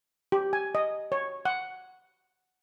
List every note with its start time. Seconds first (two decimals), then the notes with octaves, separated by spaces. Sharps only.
0.32 G4
0.53 G#5
0.75 D#5
1.12 C#5
1.45 F#5